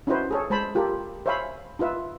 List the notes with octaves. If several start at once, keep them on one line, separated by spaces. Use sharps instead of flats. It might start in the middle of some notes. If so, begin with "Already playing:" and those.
C#4 D#4 E4 F#4 B4 C5
G#4 A4 C#5
G#3 C5 A5 B5
F4 G4 A4 A#4
C5 C#5 E5 F5 G#5 B5
D#4 F4 B4 E5